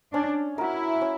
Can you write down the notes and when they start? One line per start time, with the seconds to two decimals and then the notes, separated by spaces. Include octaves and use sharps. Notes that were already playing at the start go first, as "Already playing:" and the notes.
0.13 C#4 D4
0.57 E4 F#4 A#4
1.01 C#4